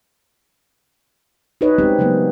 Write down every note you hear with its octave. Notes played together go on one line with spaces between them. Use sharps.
D#4 F#4 G#4 B4 C#5 D#5
G3 G#3 C4 C#4 G4
C#3 F#3 G3 A#3 B3